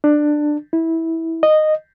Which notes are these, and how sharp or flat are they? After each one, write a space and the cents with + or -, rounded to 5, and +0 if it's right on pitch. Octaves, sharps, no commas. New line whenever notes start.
D4 +15
E4 -15
D#5 -10